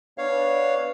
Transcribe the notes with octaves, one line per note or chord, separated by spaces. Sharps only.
B3 D4 B4 C#5 F5